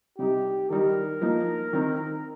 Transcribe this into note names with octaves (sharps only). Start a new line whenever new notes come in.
C3 G3 D#4 G4
D#3 G3 D#4 A#4
F3 A#3 D#4
D#3 C4 D#4